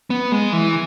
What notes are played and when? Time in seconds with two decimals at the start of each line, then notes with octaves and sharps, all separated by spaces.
0.10 B3
0.32 G#3
0.53 E3